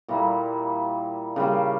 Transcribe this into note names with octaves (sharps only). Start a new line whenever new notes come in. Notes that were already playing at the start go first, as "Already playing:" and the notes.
A#2 G3 A#3 E4
C#3 G3 A#3